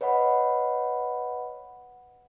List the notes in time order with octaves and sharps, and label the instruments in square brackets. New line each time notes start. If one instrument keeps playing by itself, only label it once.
[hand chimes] B4 C#5 D#5 F#5 B5